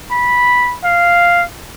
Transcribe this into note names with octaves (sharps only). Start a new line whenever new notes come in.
B5
F5